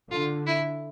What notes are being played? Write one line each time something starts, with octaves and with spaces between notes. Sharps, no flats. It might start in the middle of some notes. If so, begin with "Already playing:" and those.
D3 F4
E4